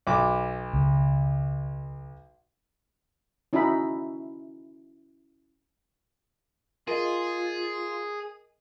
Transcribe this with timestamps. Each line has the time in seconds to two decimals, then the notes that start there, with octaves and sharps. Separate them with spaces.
0.07 B1 D6
0.73 C#2
3.53 C#4 D#4 E4 F#4 E5 B5
6.88 F4 G#4 A#4 D#5